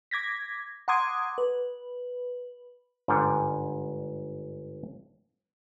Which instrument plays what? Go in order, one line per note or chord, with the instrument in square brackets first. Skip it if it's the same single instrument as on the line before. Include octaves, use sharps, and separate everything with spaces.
[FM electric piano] D6 G#6 A#6 B6
F#5 A#5 C6 D6 D#6 G#6
B4
[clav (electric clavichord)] G1 G#2 G3 D4 F#5 G5